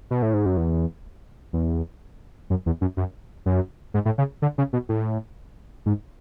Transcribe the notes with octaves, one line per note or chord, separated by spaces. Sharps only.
B2
A2
G#2
F#2
E2
E2
F#2
E2
F#2
F#2
F#2
G#2
A2
C#3
D3
C#3
B2
A2
G#2